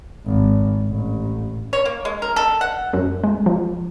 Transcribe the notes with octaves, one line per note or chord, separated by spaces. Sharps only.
G#1
A1
C#5
A#3
G#3
A#4
A4
F#5
F#2
G#3
F3